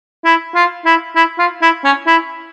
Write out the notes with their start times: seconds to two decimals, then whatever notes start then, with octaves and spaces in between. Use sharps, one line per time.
0.25 E4
0.55 F4
0.85 E4
1.16 E4
1.39 F4
1.62 E4
1.84 C#4
2.07 E4